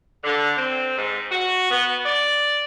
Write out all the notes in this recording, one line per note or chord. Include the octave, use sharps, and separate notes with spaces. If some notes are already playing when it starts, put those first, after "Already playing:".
D3
C4
G#2
F#4
B3
D5